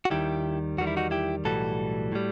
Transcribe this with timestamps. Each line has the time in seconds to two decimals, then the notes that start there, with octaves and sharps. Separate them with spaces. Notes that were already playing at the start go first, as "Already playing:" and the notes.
0.05 F#4
0.10 D#2 D#3 G3 E4 G4
0.78 E2 D#3 G3 F#4
0.87 E4
0.97 D#4 F#4
1.11 E4 G4
1.45 B1 A2 E3 G3 F#4 A4
2.12 A2 G3